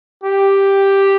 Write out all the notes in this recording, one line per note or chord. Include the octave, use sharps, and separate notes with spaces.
G4